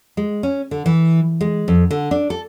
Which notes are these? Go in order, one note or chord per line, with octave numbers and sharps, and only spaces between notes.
G#3
C#4
D3
E3
G#3
F2
D3
D4
A4